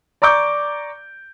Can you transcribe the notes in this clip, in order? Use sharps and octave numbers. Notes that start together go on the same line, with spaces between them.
D5 A#5 C#6 D6 G6